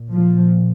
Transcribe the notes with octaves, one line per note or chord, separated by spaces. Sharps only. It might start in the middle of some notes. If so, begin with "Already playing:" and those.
Already playing: A#2
F3